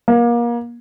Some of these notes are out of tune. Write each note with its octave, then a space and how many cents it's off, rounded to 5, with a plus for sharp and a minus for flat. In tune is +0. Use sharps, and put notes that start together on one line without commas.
A#3 +30